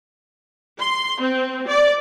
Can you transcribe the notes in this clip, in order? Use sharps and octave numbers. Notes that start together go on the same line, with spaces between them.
C6
C4
D5